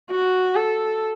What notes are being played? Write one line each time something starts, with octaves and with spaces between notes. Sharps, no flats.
F#4
A4